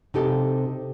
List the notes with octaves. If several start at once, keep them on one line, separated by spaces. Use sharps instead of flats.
C3 D#4 G4 A4